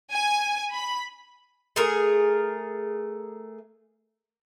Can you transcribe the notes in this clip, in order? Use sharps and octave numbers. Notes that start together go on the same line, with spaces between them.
G#5
B5
A3 G#4 A#4